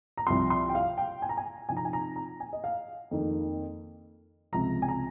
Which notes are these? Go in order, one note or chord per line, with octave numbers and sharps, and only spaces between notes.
A#5
C2 C3 F3 C4 C6
C6
G5
F5
G5
G#5
A#5
G#5
C3 F3 C4 D#4 G#5
A#5
G#5
A#5
A#5
G#5
D#5
F5
F2 D#3 A#3 D#4
C#2 C3 F3 A#5
G#5
A#5